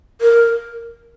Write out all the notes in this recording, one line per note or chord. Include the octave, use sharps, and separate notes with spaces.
A#4